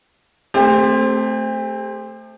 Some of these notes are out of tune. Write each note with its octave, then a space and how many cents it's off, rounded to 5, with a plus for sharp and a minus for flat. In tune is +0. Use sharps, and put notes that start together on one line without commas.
A3 +0 C4 +0 G4 +45